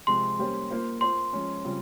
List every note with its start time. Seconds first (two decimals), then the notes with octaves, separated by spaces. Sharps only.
0.07 C3 F3 G#3 C4 C6
0.39 G3 A#3 C#4 G4 C5
0.70 A#3 F4 C5
1.01 A#3 F4 C5 C6
1.33 F3 G#3 C#4
1.65 C#3 G3 C4 F4